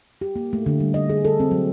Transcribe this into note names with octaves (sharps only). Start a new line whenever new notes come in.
G4
A#3
A3
D3
G3
D#5
G#4
A4
C4
F#3